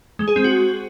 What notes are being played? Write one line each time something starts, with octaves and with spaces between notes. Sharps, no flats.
G#3
G#4
C4
F#4